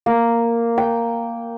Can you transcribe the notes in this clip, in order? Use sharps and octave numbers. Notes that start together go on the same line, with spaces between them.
A#3
G5